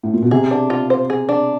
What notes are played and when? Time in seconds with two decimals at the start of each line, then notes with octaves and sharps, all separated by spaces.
0.03 A2
0.14 A#2
0.22 B2
0.31 C3 G#4
0.51 D4
0.70 F4
0.90 C5
1.10 G#4
1.29 D4